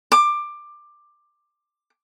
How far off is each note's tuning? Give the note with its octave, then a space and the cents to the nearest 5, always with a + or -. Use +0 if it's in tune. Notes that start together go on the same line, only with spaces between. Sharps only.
D6 +15